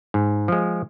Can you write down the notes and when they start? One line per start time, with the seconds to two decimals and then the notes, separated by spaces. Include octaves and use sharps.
0.14 G#2
0.48 F3 G#3